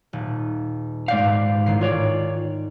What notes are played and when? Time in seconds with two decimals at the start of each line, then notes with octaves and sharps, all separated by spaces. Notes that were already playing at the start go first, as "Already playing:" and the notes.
0.13 D#1
1.08 G#2 D5 F5 G6
1.66 A1 D#3 C7
1.81 G#2 F4 C#5 D5